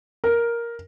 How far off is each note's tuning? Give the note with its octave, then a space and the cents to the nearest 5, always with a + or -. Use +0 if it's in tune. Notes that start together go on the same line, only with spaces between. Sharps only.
A#4 +5